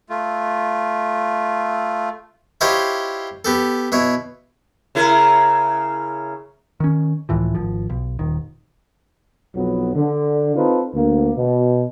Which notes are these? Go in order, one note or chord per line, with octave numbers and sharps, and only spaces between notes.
A3 F4
E4 F4 G4 C5 C#5 D#5
B3 G4 A4
B2 E4 C#5
C#3 E4 A#4
D#3 C#4
C#2 A2 E3 F3
G#1 F3
B1
D#1 D#3
B1 F2 F#3 B3
D3
C4 D#4 F4 A4 B4
D2 A#3
B2